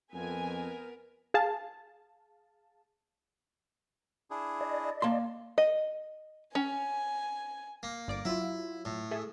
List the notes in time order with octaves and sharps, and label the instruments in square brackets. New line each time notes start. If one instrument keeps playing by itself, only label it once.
[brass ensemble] F2 [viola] B3 A#4 [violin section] G#5
[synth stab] G#4 F5 A5
[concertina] D4 E4 G#4
[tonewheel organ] D5 D#5
[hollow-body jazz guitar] A#3 A5 C6
[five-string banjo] D#5
[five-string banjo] C#4 [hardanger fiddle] G#5
[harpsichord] A#3
[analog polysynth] G1 D5 D6
[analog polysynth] F#3 F4 [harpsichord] E4
[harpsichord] A2
[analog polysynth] G#4 A4 E5